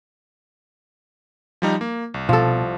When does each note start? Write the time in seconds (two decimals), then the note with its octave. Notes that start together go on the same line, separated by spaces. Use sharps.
1.62 F3 G3 D#4
1.81 A#3
2.14 C2
2.29 B2 F3 A4